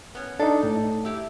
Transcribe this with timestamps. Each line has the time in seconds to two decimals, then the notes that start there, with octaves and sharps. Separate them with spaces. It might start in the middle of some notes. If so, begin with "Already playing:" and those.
0.15 B3 C#4
0.40 D4 D#4 A4
0.63 A2
1.05 E4 G4